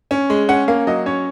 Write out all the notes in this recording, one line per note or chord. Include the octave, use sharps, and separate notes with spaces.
C#4
G#3
C#4 F#5
A#3 F5
F#3 D#5
C#4 C#5